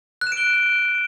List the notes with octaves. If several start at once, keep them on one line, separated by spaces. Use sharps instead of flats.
F#6
E7
D7
G7